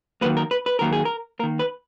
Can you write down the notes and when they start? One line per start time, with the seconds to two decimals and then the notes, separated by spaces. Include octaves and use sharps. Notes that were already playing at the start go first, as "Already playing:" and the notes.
0.21 D#3 F#3 A#3 B4
0.37 A#4
0.51 B4
0.66 B4
0.79 D#3 F#3 A#3 A#4
0.93 G#4
1.05 A#4
1.39 A#3 A#4
1.43 D#3
1.59 B4